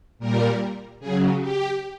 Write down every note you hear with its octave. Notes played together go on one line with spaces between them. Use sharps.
A#2 G3 A#4
C#3 F#3 G#4
G4